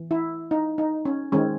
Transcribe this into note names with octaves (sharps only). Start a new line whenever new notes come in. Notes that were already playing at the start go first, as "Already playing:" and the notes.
Already playing: E3
E4
D#4
D#4
C#4
D#3 G#3 C4 C#4